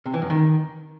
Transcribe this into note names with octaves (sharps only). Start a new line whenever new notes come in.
C3
E3
F#2
D#3